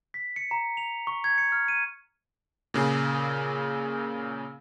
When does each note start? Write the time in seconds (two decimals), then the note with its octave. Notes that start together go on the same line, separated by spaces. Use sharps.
0.14 B6
0.36 C#7
0.51 A#5
0.77 F7
1.07 C#6
1.24 G#6
1.38 C#7
1.52 F6
1.68 D#7
2.74 A#2 C#3 G#4